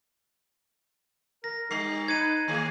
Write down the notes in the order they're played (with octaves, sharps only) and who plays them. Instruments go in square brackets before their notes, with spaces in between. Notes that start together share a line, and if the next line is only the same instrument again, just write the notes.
[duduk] A#4 [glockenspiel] A#6
[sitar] G3 [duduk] D#4 [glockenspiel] C7
[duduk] D#4 [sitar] B4 [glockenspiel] G#6 C#7 D#7
[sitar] D#3 G#4 [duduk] A#3